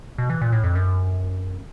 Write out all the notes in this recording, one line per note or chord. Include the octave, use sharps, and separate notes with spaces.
B2
E3
A#2
A2
F2
F#2